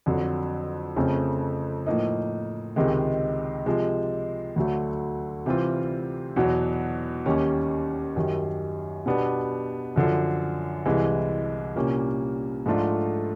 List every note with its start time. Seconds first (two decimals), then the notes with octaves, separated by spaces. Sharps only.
0.06 F2 D3 F#3
0.96 F2 C#3 F3 A3 C4
1.86 A2 F3 A#3 D#4
2.76 C#2 C3 D#3 G#3
3.66 C3 F3 G#3
4.56 D2 D3 F#3 A3
5.46 C3 E3 G3 C4 F4
6.36 E2 B2 F#3
7.26 D#2 D#3 G3 A#3 C#4
8.16 F#2 D#3 G3
9.06 B2 G3 B3 D4
9.96 F#2 D3 F3
10.86 C2 C3 E3 G#3
11.75 C2 A#2 G3 A#3 C#4
12.66 G#2 F3 A3 D4 F4